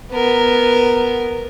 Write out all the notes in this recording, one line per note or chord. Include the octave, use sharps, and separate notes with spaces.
B3 A#4